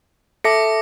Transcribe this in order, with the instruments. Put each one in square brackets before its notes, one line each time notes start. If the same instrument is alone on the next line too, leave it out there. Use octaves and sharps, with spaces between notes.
[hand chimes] A4 E5 A5 [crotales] D6 A#6 C#7